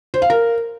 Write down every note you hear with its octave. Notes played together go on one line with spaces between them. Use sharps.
C5
F5
A#4